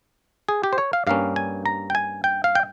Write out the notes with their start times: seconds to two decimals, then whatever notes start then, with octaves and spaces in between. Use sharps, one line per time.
0.49 G#4
0.64 G4
0.73 C5
0.78 C#5
0.93 F5
1.07 G2 G3 A#3 C#4 F5
1.36 G#5
1.66 A#5
1.90 G5
1.95 G#5
2.24 G5
2.44 F5
2.55 G5